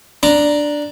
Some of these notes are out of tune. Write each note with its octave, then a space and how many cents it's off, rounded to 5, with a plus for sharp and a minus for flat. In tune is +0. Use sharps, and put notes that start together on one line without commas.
D4 +0 A#5 +0